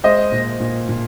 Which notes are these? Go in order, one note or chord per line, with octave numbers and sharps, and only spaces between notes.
G#3 C5 D#5
A#2
A#2
A#2